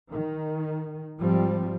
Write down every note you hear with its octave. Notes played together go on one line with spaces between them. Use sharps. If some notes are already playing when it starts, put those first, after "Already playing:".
D#3
G#2 F3 G3 C4